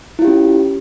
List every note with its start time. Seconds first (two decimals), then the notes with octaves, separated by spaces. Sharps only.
0.19 E4
0.22 F4
0.25 G4
0.27 C#4